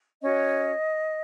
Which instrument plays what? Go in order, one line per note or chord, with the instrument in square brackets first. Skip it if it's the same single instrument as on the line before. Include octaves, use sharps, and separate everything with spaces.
[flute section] C#4 F#4 C#5 D#5